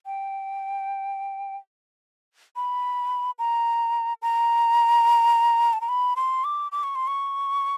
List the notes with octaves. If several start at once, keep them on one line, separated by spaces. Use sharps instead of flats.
G5
B5
A#5
A#5
A5
A#5
B5
C6
D6
D6
C#6
C6
C#6